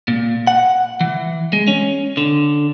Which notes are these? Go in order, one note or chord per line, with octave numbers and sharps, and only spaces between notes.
A#2
F#5
E3
G#3
C#4
D3